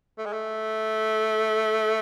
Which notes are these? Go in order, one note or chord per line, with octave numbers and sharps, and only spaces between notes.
A3
G#3
A3